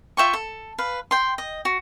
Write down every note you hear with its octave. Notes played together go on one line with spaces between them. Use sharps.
F4 E5 G5 C#6
A4
B4 F5
G5 C6
D#5
F#4